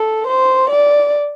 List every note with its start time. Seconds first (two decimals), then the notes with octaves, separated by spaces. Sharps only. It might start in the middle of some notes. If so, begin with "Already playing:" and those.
Already playing: A4
0.27 C5
0.70 D5